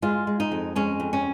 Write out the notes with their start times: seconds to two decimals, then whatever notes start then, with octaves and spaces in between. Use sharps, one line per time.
0.02 G#3 F4
0.27 G#3
0.40 D#4
0.52 F2
0.76 G#3 C#4
1.00 F2
1.13 C#4